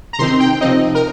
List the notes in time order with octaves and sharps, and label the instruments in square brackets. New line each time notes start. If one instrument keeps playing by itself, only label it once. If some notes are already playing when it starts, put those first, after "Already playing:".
[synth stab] A#5
C3 D#3 C4 D#4 C6
G5
C3 F3 C4 D#4 D#5
A#4